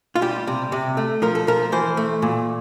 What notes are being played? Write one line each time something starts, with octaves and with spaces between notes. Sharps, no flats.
F4
G3 G4
C3
C3
A3
F3 A#4
A4
F3 A#4
E3 C5
A3
A#2